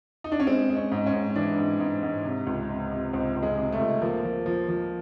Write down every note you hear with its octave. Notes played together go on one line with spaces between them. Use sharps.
D#4
D4
C#4
G#3 C4
G#3
C#4
G#2
C#4
G#2
E3 D4
G#2
G#2
G#2
C3
C#2
C3
C3
C#2 C4
C#2
G#3
C3
A3
C#2
F3 A#3
F3
F3
F3